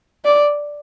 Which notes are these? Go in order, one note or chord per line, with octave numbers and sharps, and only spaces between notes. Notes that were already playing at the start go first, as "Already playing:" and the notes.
D5